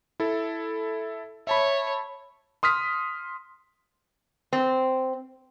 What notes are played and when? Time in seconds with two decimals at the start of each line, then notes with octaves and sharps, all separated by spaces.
0.20 E4 A4
1.47 C#5 E5 A5 B5
2.63 C6 D#6 F6 B6
4.53 C4